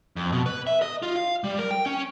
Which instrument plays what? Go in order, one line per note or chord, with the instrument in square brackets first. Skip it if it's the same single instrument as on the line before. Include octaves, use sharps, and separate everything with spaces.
[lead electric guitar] F2
B2
B4
E5
D#5
F4
F5
G3
A#4
G5
C#4